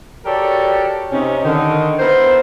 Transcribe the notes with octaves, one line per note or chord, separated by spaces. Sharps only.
F#4 G4 A4 A#4 C#5 D5
C3 C#4 D#4
D3 D#3
B3 E4 A#4 C5